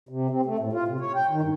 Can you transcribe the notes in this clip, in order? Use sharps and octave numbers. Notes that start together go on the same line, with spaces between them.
C3
C4
A3
A2
F4
C3
C#5
G5
D#3
G2